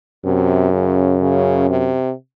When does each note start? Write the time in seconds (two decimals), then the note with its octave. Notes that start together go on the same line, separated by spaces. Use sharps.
0.25 F#2 C3
0.73 C#3
1.22 C#3
1.69 C3